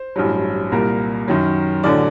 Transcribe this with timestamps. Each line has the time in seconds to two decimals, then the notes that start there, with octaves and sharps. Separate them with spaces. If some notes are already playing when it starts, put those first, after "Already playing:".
Already playing: C5
0.16 A1 G2 F#3
0.72 C2 A#2 G3 A#4
1.28 F#2 D#3 F#3
1.83 A1 D3 F#3 D5